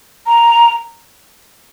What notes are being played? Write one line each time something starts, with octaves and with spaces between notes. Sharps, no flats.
A#5